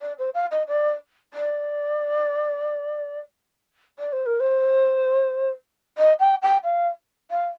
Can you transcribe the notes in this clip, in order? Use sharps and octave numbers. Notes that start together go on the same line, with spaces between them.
D5
C5
F5
D#5
D5
D5
D5
C5
A#4
C5
D#5
G5
G5
F5
F5